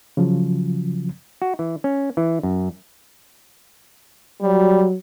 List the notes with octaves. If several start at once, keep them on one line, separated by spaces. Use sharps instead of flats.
C#3 F3 F#3
F#4
E3
C#4
E3
F#2
F#3 G3